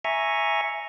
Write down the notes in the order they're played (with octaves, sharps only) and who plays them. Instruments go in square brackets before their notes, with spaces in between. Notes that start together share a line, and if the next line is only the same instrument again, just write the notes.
[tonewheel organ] E5 G#5 A#5 C#6